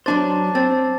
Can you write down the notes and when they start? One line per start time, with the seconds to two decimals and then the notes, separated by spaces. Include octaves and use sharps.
0.06 F#3 D4 C5 A5 D6 A6
0.55 C4 A6